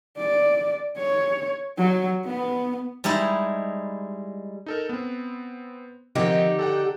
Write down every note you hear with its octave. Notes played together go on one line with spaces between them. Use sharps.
D5
C#5
F#3
B3
G3 G#3 D#4 E4
D#4 A4 A#4
B3 C4
D3 D#3 F3 C4 D#4 G4
A4 F#5 G5